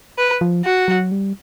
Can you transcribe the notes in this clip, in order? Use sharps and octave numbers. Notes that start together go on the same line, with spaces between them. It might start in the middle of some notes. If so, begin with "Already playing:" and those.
B4
F3
F#4
F#3
G3